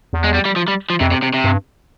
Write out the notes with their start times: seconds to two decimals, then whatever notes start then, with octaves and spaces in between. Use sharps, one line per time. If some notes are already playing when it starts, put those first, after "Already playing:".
0.13 E2
0.24 G#3
0.34 G3
0.45 G3
0.56 F3
0.68 G3
0.90 F3
1.00 F2 C3
1.12 C3
1.23 C3
1.34 C3
1.44 G2